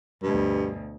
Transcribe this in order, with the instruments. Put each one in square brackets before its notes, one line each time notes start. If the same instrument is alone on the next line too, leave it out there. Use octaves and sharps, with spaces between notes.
[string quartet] D2 B2 [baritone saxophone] G2